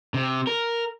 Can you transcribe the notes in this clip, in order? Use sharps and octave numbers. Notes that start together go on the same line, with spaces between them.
C3
A#4